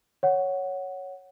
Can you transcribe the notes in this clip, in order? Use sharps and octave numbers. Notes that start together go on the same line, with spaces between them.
C#5 F#5